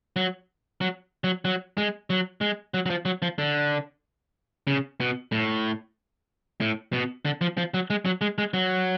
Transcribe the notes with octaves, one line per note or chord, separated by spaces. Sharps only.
F#3
F#3
F#3
F#3
G#3
F#3
G#3
F#3
F#3
F3
F#3
F3
D3
C#3
B2
A2
A2
B2
D3
F3
F3
F#3
G#3
F#3
G#3
G#3
F#3